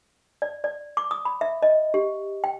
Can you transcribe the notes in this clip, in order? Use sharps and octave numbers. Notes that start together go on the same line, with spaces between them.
D5
D5
D6
D#6
B5
E5
D#5
G4
G5